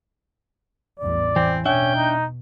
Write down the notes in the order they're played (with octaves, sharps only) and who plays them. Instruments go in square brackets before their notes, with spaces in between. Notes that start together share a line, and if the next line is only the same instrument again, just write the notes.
[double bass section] A1 E2 G2 [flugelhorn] D5
[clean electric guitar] E3 [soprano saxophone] C4
[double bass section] B2 [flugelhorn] C#4 [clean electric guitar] D4 E5 [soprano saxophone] G5
[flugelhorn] D#4